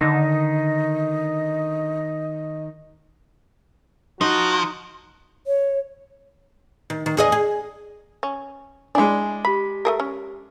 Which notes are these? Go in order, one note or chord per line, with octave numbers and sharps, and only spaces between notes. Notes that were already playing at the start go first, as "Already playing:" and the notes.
D3 D#3 D#4 D#5
F3 D#4 F#4
C#5
D#3
D#3
E2 G#4 D#5
G#4
C#4
G#3 D4 E4 D5 G#5
G4 B5 B6
A3 G#4 A#4
C#4